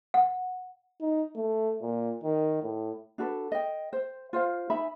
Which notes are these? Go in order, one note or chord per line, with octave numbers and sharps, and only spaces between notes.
F#5
D#4
A3
A#2
D#3
A2
D4 F#4 A4 B4
D#5 G5
C5
F4 C5 F5
D#4 E5 G#5 B5